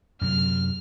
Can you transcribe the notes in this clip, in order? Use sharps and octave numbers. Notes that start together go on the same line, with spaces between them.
F#2 C3 F#3 F6